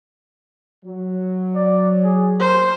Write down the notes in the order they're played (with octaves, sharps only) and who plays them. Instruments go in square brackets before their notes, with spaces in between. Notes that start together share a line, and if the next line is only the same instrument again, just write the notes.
[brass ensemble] F#3
[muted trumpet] D5
G#4
[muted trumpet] A#4 [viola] C5